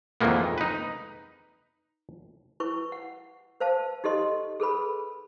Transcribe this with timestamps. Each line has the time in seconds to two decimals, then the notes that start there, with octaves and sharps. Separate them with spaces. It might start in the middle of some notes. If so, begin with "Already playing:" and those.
0.21 F2 D#3 E3 G#3 A#3 B3
0.58 D#4 B4
2.60 E4 B4 C#6
2.92 F#5
3.60 B4 C5 F5 A5
4.04 D#4 G4 A4 D#5 C6
4.60 G#4 A4 B4 B5